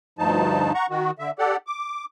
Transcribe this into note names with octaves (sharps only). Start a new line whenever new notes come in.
D2 G2 F3 D#4 A5
F#5 A#5 C#6
D#3 F#4
D3 E5
G4 A4 D5 F#5
D6